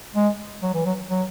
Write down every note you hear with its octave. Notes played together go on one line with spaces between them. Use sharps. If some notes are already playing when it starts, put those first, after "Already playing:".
G#3
F#3
E3
F#3
F#3